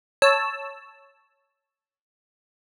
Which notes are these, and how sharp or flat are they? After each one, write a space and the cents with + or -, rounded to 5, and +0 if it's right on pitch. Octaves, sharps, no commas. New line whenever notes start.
C#5 +0 A5 +0 E6 +0